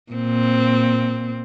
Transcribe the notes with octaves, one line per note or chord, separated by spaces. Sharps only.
A#2 C4